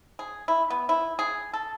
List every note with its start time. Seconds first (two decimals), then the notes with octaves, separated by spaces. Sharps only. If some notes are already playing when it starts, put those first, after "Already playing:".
0.19 G#4
0.48 E4
0.70 B3
0.89 E4
1.19 G#4
1.53 A4